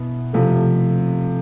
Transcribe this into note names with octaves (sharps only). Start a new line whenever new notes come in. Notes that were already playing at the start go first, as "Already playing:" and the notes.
Already playing: B2 B3 E4
C3 F3 A3